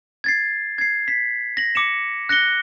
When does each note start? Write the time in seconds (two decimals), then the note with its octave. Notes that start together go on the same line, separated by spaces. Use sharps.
0.24 G#6 A6 C7
0.78 G#6 C7
1.08 B6
1.57 A#6 F#7
1.75 D6 C#7 E7
2.29 F#6 A#6 C#7 G7